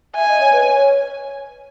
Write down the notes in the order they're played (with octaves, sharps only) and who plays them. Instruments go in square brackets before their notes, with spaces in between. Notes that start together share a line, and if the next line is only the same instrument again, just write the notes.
[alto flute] E5 [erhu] G#5
[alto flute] D#5
C#5
B4
C#5